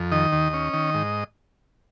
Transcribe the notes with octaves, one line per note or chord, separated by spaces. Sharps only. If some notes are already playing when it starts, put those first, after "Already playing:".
Already playing: F2
D#3 D#5
D#2
C#4
D#3
G#2